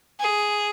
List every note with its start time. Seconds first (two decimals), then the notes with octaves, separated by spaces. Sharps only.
0.20 G#4